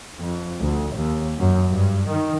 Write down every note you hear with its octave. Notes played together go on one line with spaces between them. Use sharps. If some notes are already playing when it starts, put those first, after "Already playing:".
F2
D2
D#2
F#2
G2
D#3